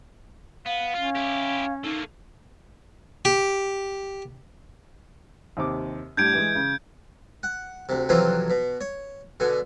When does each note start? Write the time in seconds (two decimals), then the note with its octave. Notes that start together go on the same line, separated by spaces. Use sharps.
0.66 B3 F5
0.95 C#4 F4
1.15 E4 G4
1.84 A3 A#3 D#4
3.25 G4
5.57 D#2 C3 D6
6.17 A2 G3 D4 G6 G#6 D7
6.34 E3 G#3
6.55 C#3
7.43 F#5
7.89 D2 C3
8.09 F2 C3 E3 F#3 C4 F4
8.50 B2
8.81 C#5
9.40 B2 D3 G#5